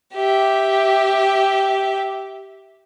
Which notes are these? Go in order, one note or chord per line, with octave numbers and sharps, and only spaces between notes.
G4 E5